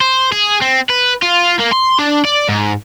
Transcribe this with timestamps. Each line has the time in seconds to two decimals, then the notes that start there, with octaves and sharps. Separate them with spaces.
0.01 C5
0.32 G#4
0.62 C4
0.90 B4
1.22 F4
1.59 A#3
1.72 C6
1.98 D4
2.25 D5
2.49 G#2